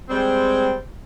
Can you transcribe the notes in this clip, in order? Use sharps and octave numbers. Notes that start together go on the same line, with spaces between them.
G3 G#3 C4